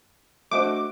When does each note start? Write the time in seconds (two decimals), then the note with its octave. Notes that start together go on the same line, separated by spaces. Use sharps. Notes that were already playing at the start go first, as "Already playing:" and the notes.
0.51 A3 D4 F#4 C5 D#5 D6